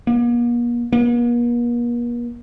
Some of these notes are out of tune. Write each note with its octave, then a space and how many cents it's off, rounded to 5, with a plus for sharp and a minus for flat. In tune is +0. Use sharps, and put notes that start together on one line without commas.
A#3 +45
A#3 +45